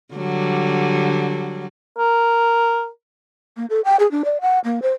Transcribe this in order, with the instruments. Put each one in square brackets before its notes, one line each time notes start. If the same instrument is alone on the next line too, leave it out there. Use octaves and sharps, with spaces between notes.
[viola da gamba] D3 F#3 G3
[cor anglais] A#4
[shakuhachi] A#3
A4
G5
G#4
D4
D5
F#5
A#3
C5